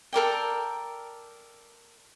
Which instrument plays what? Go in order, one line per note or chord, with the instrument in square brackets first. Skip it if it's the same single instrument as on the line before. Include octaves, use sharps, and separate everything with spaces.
[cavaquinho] A4 A#4 D5 G5